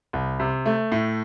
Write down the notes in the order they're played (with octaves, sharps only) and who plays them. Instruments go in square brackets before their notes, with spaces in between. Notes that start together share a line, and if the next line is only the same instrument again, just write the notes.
[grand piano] C2
C3
A3
A2